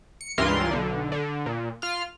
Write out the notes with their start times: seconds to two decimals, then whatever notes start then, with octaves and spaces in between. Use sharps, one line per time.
0.21 C#7
0.38 C#2 G2 E3 F4 A#4 C6
0.71 B1 D3
1.12 D3
1.46 A#2
1.82 F4 F6